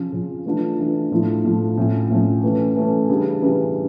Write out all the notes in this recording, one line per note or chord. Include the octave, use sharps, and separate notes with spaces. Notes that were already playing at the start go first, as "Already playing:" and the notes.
Already playing: C#3 F3 C#4
C#3 F3 C#4
E3 A3 D4 F4
E3 A3 D4 F4
A2 F3 A3 E4
A2 F3 A3 E4
A2 F3 C#4
A2 F3 C#4
E3 A3 C#4
E3 A3 C#4
C#3 E3 G3 D4
C#3 E3 G3 D4